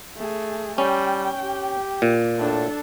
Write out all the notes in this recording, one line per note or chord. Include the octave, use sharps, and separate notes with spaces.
A3 G#4
G3 C#4 G5
G4
A#2
A2 D4 A4